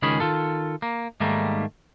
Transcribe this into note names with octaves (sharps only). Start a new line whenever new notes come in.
C#2 D#3 C#4 G#4 B5
D#3 F4 A4
A#3
G#2 D#3 G3 A3 A#3